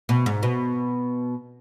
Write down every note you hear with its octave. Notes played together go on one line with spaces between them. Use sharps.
B2
G#2
B2